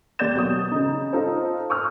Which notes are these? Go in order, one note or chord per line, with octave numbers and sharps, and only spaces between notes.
D#2 C3 D5 G6 A6 E7
B2 F#3 D#6
C#3 D#4
D#4 F4 A4 C5
C#6 D#6 F6